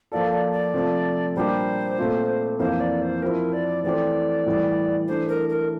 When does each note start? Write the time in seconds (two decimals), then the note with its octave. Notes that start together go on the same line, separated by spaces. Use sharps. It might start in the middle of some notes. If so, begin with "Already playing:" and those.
0.12 F3 A#3 F4 A4 D5
0.32 D5
0.52 D5
0.74 C3 F3 A3
1.35 A#2 G3 D4 G4 A#4 C5
1.98 A#2 A3 C4 F4
2.59 F2 E3 A#3 C5
2.80 D5
3.02 C5
3.22 F3 C4 E4 A#4
3.53 D5
3.84 E3 A3 C4 G4 D5
4.46 A2 E3 G3
5.08 E3 A3 D4 C5
5.29 A#4
5.49 A#4